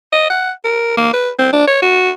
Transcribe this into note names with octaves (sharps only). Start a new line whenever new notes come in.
D#5
F#5
A#4
A#3
B4
C4
D4
C#5
F#4